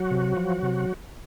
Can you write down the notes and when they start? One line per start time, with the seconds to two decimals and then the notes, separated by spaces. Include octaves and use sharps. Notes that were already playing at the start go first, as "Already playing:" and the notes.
Already playing: F#3 F#4
0.11 C3
0.37 F3
0.63 C3